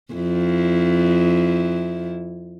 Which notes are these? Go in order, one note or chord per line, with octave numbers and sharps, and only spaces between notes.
F2 E4